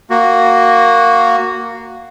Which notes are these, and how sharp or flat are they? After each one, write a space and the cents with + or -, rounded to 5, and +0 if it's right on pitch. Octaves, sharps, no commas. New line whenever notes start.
A#3 -5 F#4 +0